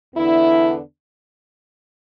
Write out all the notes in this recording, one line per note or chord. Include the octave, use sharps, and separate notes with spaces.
E2 D3 B3 D4 E4